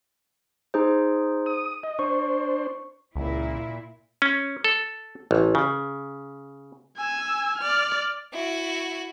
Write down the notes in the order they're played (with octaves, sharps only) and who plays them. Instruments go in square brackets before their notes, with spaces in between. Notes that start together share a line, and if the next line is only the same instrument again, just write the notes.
[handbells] D#4 G#4 C5
[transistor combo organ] D#6
D#5
[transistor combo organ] D4 C5 [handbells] C#6
[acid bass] C#2 [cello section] A#2 E4
[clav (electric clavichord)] C#4
A4
A1
C#3
[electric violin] G#5 E6
D5 F6
[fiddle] E4 F#4